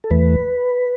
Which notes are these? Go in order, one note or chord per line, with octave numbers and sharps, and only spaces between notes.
A4
E2 E3 A3 B4